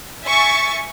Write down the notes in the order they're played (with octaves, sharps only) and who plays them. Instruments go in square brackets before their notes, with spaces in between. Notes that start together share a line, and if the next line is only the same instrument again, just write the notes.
[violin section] E5 G#5 C#6 A6